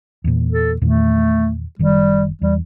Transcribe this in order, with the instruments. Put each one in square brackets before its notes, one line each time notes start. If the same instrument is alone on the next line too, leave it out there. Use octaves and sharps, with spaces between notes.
[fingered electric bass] E2 A#2
[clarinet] A4
[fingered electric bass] E2 A#2 D#3 [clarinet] A3
[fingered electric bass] F#1 D#3 [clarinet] G3
[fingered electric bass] E2 [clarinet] G3